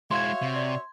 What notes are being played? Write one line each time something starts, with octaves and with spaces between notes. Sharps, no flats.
G#3 E4 F#4 C#5 E5 F5 C6 G#6
C3
D5